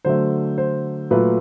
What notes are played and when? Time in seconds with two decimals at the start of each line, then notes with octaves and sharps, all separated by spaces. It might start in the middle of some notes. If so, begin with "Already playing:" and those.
0.05 D3 F#3 A3 C5
0.58 C5
1.11 A#2 F#3 A3 B4